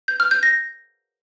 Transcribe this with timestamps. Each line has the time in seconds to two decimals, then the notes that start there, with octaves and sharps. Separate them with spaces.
0.08 G6
0.20 F6
0.31 G6
0.43 A#6